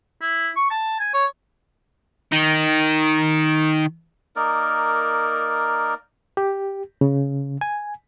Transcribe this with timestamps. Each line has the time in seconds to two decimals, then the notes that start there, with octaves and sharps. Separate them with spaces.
0.21 E4
0.56 C#6
0.70 A5
0.99 G#5
1.13 C#5
2.32 D#3 D#4
4.36 A#3 D#4 A#4 D5
6.37 G4
7.01 C#3
7.61 G#5